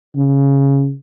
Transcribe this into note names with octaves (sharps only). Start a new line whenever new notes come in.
C#3